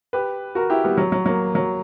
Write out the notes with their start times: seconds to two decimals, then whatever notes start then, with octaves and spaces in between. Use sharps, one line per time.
0.13 G4 B4
0.55 F#4 A#4
0.70 E4 G4
0.84 G3 B3
0.98 F#3
1.12 F#3
1.26 F#3 A#3
1.55 F#3